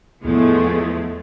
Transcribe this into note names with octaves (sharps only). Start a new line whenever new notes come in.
E2 A2 F3 G#3 A3